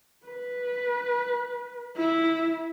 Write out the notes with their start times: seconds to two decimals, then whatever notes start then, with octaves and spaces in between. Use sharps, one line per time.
0.27 B4
1.96 E4